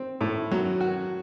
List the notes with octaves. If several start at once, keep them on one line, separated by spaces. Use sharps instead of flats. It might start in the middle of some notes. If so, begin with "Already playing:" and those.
Already playing: C4
A2
F#3
F#4